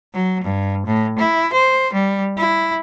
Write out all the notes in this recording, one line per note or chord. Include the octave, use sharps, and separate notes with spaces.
F#3
G2
A2
E4
C5
G3
E4